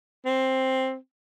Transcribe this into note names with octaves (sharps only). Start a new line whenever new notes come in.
C4